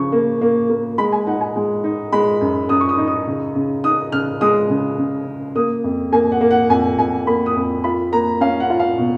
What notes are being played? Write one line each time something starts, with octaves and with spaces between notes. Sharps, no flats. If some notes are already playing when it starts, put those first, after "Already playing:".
Already playing: C#3 F3 C#6
A#3
A#3
A#3
G#3 B5
G#5
D#4 F#5
G#5
G#3
D#4
G#3 B5
F#2
F#2 D#6
C#6
D#6
D#4
D#6
C#3
C#3
D#4 D#6
C#3 F6
G#3 D#6
C#3
C#3
C#3
A#3 D#6
F2
A#3 G#5
F#5
A#3
F#5
F2 G#5
F2 G#5
A#3 B5
D#6
F2
F4 B5
A#3 A#5
C#4 F5
F#5
F4
F5
B2